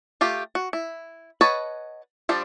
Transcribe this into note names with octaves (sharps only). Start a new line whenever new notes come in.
A3 F4 G4
F#4
E4
B4 C#5 D#5 F#5 A5
F3 G3 D4 C5